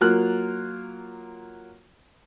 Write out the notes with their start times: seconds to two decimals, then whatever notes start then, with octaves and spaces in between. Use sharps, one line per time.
0.01 F#3 A#3 F4 F6 F#6